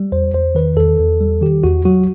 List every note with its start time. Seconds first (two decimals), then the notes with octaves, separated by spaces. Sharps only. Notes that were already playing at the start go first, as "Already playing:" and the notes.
Already playing: G3
0.12 E2 C5
0.34 E2 C5
0.55 D#3 B4
0.77 E2 A4
0.99 E2
1.21 G3
1.42 D#3 G4
1.63 E2 F#4
1.85 F#3 F#4